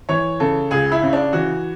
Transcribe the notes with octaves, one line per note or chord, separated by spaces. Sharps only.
E3 C#5
C#3 A4
C#2 G#4
E4
C#3
D4
E3 F#4